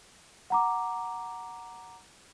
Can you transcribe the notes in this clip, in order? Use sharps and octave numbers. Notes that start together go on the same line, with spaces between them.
F#5 A#5 D6